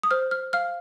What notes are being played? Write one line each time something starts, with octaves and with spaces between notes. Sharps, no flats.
D#6
C5 F6
F6
F5 F6